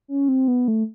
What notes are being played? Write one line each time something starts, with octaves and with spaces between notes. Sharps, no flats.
C#4
C4
B3
A3